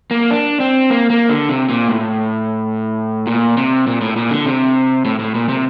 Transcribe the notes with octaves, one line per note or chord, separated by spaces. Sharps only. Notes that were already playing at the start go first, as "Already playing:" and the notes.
A#3
D4
C4
A#3
A#3
D3
C3
A#2
A2
A#2
C3
A#2
A2
A#2
D3
C3
A2
A2
A#2
C3